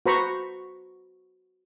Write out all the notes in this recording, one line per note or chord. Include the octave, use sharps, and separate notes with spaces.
F#4 B4 C5 A#5 B5 C#6